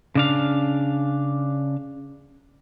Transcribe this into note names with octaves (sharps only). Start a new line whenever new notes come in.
C#3 D4 F5